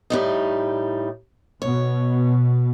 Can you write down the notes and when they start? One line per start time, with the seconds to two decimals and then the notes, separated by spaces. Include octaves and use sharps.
0.10 A2 G3 D#4
1.62 B2 C#5